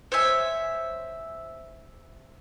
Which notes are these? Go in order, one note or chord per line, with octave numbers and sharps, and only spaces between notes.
C5 C#5 E5 G#5